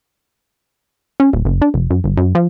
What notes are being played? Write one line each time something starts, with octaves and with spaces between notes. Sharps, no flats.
C#4
D#1
F#1
D4
F1
F#2
G1
F#2
F3